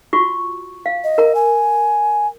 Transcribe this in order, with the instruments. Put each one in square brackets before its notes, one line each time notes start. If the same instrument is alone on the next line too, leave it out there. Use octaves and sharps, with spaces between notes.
[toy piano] F4 F#4 C#6
F5
[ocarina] D#5
[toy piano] A#4 A#5
[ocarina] G#5